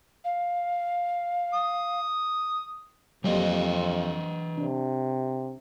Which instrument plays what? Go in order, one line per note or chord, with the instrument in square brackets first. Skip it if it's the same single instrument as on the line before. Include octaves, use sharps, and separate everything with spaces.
[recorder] F5
[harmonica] D#6
[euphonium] F2 [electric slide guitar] E3 C5 D#5 [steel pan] F#3 G3 A#3
[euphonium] C3 [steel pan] D4